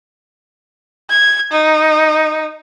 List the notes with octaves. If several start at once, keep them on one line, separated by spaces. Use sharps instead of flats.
G#6
D#4